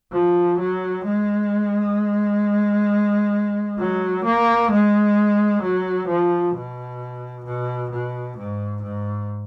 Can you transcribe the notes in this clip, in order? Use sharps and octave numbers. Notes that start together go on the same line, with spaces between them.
F3
F#3
G#3
F#3
A#3
G#3
F#3
F3
B2
B2
B2
G#2
G#2